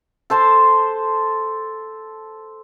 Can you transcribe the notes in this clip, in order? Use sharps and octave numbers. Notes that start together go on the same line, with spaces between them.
A4 C5 A5 C6